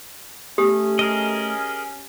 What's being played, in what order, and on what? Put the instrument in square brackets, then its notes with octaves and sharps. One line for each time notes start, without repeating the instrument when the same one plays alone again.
[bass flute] A3 [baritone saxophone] C#4 [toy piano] G4 D#6
[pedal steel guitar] G#4 A#4 D#5